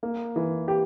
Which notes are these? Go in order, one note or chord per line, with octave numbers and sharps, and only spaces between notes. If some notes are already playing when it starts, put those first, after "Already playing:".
A#3
E3
G4